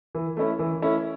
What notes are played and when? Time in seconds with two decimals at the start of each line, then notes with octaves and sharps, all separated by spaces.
0.15 E3
0.37 A3 C#4 E4
0.59 E3
0.82 A3 C#4 E4